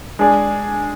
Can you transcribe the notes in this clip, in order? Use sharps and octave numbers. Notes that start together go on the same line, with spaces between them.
G#3 D4 G#4 D5